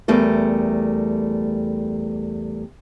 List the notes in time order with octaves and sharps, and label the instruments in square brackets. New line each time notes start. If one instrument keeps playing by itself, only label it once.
[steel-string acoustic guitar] E2 G3 A3 A#4